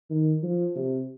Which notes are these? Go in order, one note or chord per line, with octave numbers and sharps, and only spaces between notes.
D#3
F3
C3